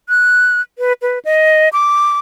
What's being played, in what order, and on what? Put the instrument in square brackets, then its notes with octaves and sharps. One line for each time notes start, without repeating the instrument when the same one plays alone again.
[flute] F#6
B4
B4
D#5
D6